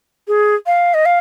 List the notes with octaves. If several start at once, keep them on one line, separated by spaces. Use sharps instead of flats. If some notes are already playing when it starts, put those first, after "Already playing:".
G#4
F5
D#5
F5